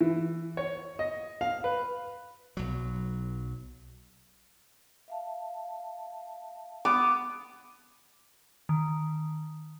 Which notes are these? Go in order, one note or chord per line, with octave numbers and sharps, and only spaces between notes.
E3
C#5
D#5
F5
B4
B1 F#3
E5 F5 A5
B3 D6
D#3